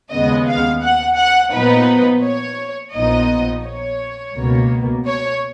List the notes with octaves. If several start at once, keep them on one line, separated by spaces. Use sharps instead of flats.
D#2 C#3 G#3 B3 D#5
F5
F#5
F#5
A#2 F3 B3 D#4 B4
C#5
A#1 A#2 F3 B3 D#4 D#5
C#5
C#2 B2 A#3
C#5